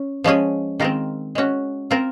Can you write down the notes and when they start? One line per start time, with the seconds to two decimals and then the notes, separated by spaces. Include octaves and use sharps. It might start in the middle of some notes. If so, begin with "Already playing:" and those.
Already playing: C#4
0.24 F3 G#3 C#4 G#4
0.80 D#3 G#3 C4 F4 A#4
1.35 G#3 C#4 F#4
1.91 C4 F4 A#4